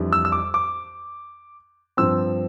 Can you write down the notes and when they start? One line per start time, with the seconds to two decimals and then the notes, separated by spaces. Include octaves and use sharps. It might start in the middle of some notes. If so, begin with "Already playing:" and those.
Already playing: F2 E3 G3 D4
0.13 E6
0.25 E6
0.32 D6
0.54 D6
1.97 G2 F3 C4 E6